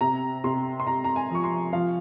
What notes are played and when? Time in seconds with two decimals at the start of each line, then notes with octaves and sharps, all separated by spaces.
0.01 C3 A#5
0.44 C3 C6
0.80 C6
0.87 C3 A#5
1.04 A#5
1.16 G#5
1.30 F3 C#6
1.44 C6
1.73 F3 F5